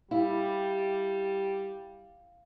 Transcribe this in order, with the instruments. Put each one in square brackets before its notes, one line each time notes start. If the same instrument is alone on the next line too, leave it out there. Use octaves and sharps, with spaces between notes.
[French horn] G3 [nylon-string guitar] E4 [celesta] F5